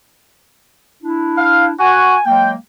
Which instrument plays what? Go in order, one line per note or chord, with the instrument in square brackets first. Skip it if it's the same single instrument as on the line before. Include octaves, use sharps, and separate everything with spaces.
[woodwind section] D4 E4
[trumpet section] F5
[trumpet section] F#4 [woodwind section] G#5
[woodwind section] F#3 G#3 A#3 [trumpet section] G5